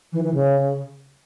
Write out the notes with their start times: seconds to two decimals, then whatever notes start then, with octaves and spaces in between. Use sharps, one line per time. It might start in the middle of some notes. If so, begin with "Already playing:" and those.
0.13 E3
0.23 E3
0.34 C#3